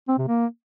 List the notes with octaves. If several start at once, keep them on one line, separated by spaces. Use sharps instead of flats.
C4
C3
A#3